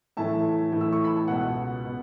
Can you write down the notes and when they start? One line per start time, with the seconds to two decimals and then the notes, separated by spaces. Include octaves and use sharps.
0.17 A2 E3 A3 E5 A5
0.72 A2 E3 A3
0.81 E6
0.92 C#6
1.04 B5
1.16 A5
1.28 C#2 B2 B3 F#5
1.84 B2 B3